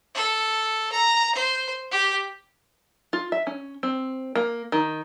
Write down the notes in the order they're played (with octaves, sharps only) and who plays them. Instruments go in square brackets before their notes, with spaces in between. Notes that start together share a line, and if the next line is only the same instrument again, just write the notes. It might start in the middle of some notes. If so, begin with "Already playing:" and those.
[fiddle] A4
A#5
C5
G4
[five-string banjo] F4
E5
C#4
C4
A#3
D#3